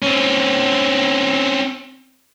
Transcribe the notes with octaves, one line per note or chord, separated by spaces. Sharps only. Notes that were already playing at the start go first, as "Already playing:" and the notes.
C4 C#4